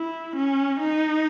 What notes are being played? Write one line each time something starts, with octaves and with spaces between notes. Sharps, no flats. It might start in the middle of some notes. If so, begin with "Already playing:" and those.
Already playing: E4
C#4
D#4